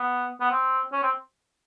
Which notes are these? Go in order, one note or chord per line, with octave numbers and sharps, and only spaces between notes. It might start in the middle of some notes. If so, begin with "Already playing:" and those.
Already playing: B3
B3
C4
C#4
C4